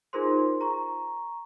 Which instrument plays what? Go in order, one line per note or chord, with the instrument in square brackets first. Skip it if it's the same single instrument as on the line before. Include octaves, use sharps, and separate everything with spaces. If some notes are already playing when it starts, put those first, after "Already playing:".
[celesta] D#4 F4 G#4 A#4 C5 C6
A#5 C#6